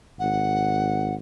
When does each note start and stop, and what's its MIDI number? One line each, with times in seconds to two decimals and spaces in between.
0.19 1.20 32
0.19 1.14 78